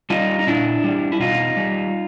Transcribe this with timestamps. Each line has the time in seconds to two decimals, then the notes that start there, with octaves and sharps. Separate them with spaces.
0.10 G3 D#4 F4
0.39 D#4
0.47 A#2 D4 E4
0.84 G3
1.12 E4
1.20 B2 D#4 F4
1.57 G3